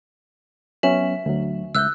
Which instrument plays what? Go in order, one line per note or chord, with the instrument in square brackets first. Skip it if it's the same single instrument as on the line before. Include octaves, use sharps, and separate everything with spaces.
[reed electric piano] F#3 B3 C#4 [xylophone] E5 E7 F#7
[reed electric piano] D2 F#3
[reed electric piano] C#2 E5 G6 [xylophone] E6 F#6